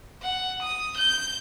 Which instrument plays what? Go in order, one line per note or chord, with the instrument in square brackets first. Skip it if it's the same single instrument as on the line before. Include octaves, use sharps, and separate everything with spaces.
[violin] F#5
D#6
G6